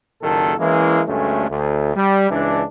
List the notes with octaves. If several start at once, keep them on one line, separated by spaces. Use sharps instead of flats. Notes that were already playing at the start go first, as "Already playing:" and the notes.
F#1 A#2 D#3 A4
E3 G#3 A#3 C#4 E4
D2 G2 G#3 A3 C#4
D2
G3
C#2 E3 D4